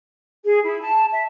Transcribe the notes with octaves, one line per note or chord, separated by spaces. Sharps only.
G#4
E4
A5
E5